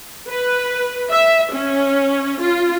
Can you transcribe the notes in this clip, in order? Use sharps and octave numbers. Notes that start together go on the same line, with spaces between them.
B4
E5
C#4
F4